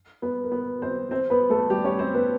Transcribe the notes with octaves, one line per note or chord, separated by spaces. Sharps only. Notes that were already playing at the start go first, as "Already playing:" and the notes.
B3 B4
A#4
B3 B4
C4 C5
C4 C5
B3 B4
A3 A4
G3 G4
C#4 C#5
C4 C5
B3 B4